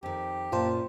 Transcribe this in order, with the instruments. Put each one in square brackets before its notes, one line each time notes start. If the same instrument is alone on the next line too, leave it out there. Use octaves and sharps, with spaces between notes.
[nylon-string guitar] F2 D#3 [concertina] G4
[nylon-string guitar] F#2 A#2 A5 [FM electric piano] F4 C5